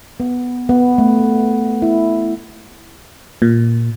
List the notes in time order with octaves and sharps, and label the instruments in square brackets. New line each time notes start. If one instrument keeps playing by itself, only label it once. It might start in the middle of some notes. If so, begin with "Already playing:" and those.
[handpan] B3
B3
A3
E4
[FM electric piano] A#2